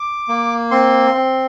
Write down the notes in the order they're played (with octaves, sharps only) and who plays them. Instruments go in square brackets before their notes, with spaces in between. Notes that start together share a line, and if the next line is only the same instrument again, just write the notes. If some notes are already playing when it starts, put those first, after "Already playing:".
Already playing: [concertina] D6
A#3
C4 C6
C4